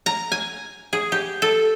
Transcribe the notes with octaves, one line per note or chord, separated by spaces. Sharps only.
A#5
G#5
G#4
G4
A4